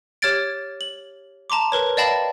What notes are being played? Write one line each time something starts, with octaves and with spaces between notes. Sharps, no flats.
G4 C#5 F6 G#6 A6 D7
F#7
A5 A#5 C6 D6
A#4 B4 C#5
D5 D#5 F5 G5 A5 B5